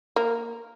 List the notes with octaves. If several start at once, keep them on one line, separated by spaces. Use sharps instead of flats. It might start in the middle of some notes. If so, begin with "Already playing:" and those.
A#3